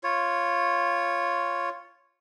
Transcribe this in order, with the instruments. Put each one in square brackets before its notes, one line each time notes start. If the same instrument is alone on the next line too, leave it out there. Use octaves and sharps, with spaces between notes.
[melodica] F4 C#5